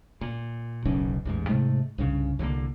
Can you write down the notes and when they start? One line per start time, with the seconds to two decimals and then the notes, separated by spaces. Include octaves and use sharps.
0.21 A#2
0.85 D1 B1 F#2 C#3
1.25 A1 E2 G#2
1.49 G#2 C3 G#3 A3
1.98 C2 G2 C#3
2.39 C2 D3 E3 A#3